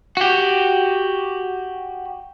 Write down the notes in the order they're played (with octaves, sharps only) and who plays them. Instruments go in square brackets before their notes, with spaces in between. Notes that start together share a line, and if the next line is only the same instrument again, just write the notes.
[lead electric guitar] F#4 G4